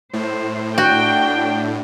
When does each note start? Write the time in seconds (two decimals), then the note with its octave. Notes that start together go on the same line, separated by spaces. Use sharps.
0.13 A2 C5
0.78 D4 F#4 G5